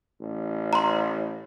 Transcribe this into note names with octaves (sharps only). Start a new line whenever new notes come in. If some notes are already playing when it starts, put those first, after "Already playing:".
A1
A#5 C6